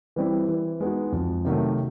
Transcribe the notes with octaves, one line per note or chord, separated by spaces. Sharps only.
E3 G3 C4 E4
E3
G#3 B3 D#4 F#4
F2
C3 D#3 F#3 A3